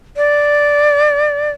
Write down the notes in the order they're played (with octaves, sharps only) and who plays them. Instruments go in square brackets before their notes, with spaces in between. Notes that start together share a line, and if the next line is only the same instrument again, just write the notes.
[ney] D5